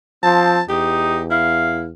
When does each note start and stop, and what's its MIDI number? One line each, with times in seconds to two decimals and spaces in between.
0.23 0.61 53
0.23 0.57 60
0.23 0.62 81
0.69 1.93 40
0.69 1.18 63
0.69 1.24 67
1.31 1.87 64
1.31 1.82 77